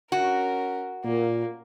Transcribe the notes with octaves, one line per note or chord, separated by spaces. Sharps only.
C#4 F#4 A#4
A#2 A#3